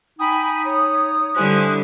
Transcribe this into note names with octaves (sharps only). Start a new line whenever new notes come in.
D#4 G5 G#5 B5 D#6
C#5
D3 G3 E4 C5 G#5 F#6